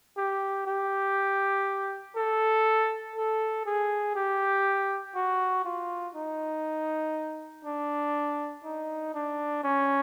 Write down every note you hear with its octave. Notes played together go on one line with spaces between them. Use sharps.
G4
G4
A4
A4
G#4
G4
F#4
F4
D#4
D4
D#4
D4
C#4